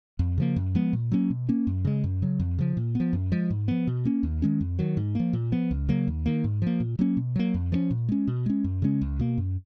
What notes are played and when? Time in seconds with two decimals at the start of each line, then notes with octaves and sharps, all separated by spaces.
0.19 F2
0.38 C#3 F3 A#3
0.56 F#2
0.75 F3 G#3 B3
0.93 A#2
1.12 F#3 A#3 C#4
1.30 B2
1.49 A#3 C#4
1.67 F#2
1.85 C#3 G#3
2.04 F#2
2.22 C#3 F#3
2.40 F2
2.58 C#3 F3
2.77 A#2
2.95 F3 B3
3.13 F#2
3.32 F3 G#3
3.50 G#2
3.68 F3 B3
3.87 B2
4.05 A#3 C#4
4.23 D#2
4.42 D#3 G#3 C#4
4.61 F2
4.79 D#3 F#3
4.97 G#2
5.15 F3 A#3
5.33 A#2
5.52 F3 B3
5.71 C#2
5.89 C#3 F#3 A#3
6.07 D#2
6.26 D#3 A#3
6.44 G#2
6.62 F3 A#3
6.80 A#2
6.99 F#3 A#3 C#4
7.17 B2
7.36 F#3 A#3
7.54 F2
7.72 F3 G#3 C#4
7.91 A#2
8.09 G#3 C#4
8.27 B2
8.46 G#3 C#4
8.64 F#2
8.82 C#3 G#3 C#4
9.02 C#2
9.19 B2 A#3
9.38 F#2